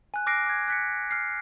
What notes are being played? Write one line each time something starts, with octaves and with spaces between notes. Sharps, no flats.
G#5 F#6
D6 F6 F#6 A#6 C7 D7
D6 G#6
F#6 B6 C#7
F6 C7